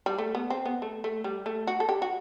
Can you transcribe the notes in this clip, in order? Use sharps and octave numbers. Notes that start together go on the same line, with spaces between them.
G3
A3
B3
C4
B3
A3
A3
G3
A3
F#4
A4
G4
F#4